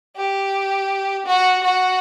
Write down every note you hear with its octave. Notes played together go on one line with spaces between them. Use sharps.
G4
F#4
F#4